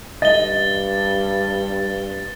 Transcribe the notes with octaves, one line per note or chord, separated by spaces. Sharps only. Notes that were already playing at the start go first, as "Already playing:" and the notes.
G2 D#5 A6 G7